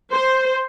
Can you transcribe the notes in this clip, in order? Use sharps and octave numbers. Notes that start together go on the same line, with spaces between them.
C5